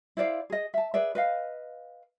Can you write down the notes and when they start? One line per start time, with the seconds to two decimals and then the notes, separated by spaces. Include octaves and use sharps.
0.17 E4 C5 D5 F5
0.50 G#4 D#5
0.74 E5 A5
0.94 G#4 B4 D5 E5
1.15 B4 D#5 F5